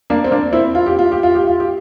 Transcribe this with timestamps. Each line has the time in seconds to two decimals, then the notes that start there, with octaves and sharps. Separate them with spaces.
0.10 A#3 D4
0.24 C4
0.31 A#3 D4
0.53 C4 E4
0.75 F4
0.86 G4
0.99 F4
1.12 G4
1.23 F4
1.35 G4
1.47 F4
1.60 G4